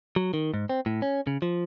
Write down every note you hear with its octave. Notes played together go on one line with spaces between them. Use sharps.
F#3
D#3
G#2
C4
A2
C#4
C#3
F3